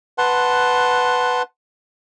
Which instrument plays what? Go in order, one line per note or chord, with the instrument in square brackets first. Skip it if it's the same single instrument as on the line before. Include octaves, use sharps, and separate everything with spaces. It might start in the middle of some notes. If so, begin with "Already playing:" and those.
[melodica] B4 F#5 A5 C6